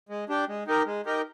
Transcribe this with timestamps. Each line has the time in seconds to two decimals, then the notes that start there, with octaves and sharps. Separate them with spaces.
0.09 G#3
0.29 D4 G4
0.48 G#3
0.67 D#4 G4 A#4
0.86 G#3
1.06 D#4 G4 A#4